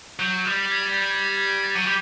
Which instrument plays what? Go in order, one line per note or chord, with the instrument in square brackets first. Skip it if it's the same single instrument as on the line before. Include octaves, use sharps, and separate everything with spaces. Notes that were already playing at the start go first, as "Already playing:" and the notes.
[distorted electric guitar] F#3 [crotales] G6
[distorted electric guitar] G3
[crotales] G#6
A6
G6
G#6
A6
G#6
G#6
A6
[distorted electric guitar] F#3 [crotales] C#7 D#7
[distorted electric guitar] G3